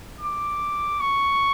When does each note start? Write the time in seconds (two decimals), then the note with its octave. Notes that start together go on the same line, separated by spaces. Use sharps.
0.21 D6
1.00 C#6